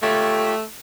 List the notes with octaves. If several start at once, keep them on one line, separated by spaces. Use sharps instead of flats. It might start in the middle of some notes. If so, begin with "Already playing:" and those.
A3 F4 G4 C#5